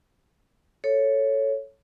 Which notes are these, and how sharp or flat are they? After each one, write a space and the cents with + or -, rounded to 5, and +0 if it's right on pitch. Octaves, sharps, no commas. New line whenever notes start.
A4 +0 C#5 +0